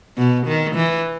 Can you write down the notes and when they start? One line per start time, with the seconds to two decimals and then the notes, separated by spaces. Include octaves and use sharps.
0.17 B2
0.47 D#3
0.75 E3